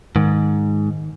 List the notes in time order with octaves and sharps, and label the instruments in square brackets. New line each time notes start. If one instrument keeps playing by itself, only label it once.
[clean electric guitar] G#2 [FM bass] D#3